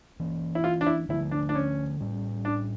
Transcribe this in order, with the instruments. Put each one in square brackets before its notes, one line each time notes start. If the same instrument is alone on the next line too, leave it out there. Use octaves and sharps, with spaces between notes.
[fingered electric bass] E3 A#3 C#4
[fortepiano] E4
F4
D4
E4
[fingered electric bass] D3 F3 A3 [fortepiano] E4
[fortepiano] D4
D4
C#4
[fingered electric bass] A2 G3 C#4
[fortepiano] D4